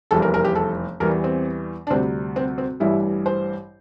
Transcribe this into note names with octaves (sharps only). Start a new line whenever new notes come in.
F1 E2 E3 G3 A4
A#4
A#4
G4
A4
E2 E3 G3 A#4
C4
D4
D2 C3 G3 C4
C4
C4
A1 G2 E3 G3 E4
C5